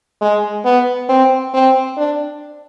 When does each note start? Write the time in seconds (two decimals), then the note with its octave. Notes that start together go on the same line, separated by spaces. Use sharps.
0.21 G#3
0.65 B3
1.09 C4
1.54 C4
1.97 D4